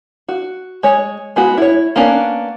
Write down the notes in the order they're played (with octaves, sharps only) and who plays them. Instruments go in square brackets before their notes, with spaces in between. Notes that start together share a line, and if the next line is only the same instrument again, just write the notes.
[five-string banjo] F#4
G#3 C#5
G#3 B3 F#4
E4 C#5
A#3 B3 C#4 D4